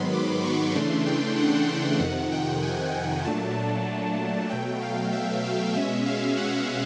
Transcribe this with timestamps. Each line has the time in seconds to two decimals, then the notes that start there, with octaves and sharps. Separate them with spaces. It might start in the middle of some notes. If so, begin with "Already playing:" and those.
Already playing: G#2 D#3 F#3 B3 B5 C6
0.13 D6
0.44 C#6
0.75 C#3 E3 A3 D4 C6
1.06 G5
1.37 F#5
1.69 G5
2.00 F2 C3 D#3 F#5
2.32 G5
2.63 G#5
3.25 A#2 F#3 A3 D4 A5
3.56 A5
4.50 B2 F#3 A3 G5
4.82 F5
5.13 E5
5.44 F5
5.75 B2 G#3 C#4 E5
6.06 F5
6.37 F#5